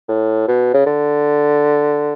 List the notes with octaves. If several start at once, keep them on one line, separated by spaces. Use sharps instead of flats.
A2
B2
C#3
D3